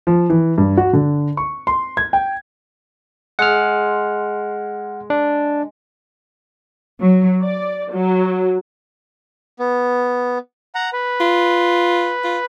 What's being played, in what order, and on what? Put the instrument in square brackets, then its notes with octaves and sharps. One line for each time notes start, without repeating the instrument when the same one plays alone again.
[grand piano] F3
E3
G2
F#4
D3
C#6
C6
G#6
G5
[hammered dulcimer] G#3 [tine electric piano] F#5 F6
[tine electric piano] D4
[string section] F#3
D5
F#3
[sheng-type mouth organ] B3
F#5 A#5
B4
[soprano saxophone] F4
F4